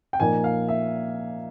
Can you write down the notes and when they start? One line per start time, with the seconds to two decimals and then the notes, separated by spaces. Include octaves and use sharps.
0.13 G5
0.20 A#2 F3 A#3 D#4 G#5
0.44 F5
0.68 E5